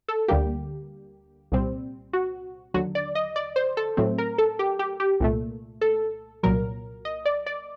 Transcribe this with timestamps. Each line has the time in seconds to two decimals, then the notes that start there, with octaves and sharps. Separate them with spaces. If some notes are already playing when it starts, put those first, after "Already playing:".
0.08 A4
0.28 D2 D3 G3 A#3 G4
1.52 C2 A#2 G3 C4
2.13 F#4
2.74 D#2 D3 F#3 F#4
2.95 D5
3.15 D#5
3.36 D5
3.56 C5
3.77 A4
3.97 A2 F#3 A3 C4
4.18 A#4
4.38 A4
4.59 G4
4.79 G4
5.00 G4
5.20 C2 A#2 A3
5.81 A4
6.43 C2 A#2 F#3 A#4
7.05 D#5
7.25 D5
7.46 D5